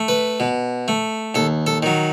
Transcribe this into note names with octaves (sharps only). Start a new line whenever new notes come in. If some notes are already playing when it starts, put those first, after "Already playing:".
Already playing: A3
B4
B2
A3
D#2 A4
A4
D#3 F#3